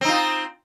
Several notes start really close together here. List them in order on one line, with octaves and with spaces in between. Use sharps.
C4 D#4 F4